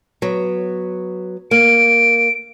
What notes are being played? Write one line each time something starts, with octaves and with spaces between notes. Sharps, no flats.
F#3 B3
A#3 D7